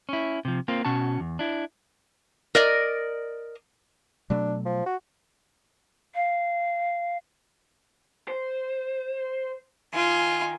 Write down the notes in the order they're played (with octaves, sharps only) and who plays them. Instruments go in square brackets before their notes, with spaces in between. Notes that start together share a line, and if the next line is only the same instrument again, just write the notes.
[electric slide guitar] C#4 E4
C3 F3
A#3 C4 F4
B2 C#4 F#4 A5
E2
D4 E4
[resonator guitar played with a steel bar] A#4 D5 D#5
[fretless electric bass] B2 F#3 A3 [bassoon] D4
[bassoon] F3
F#4
[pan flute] F5
[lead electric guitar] C5
[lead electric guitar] D#3 [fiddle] F4 G#5